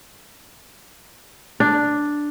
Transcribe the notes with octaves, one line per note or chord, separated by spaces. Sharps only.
D4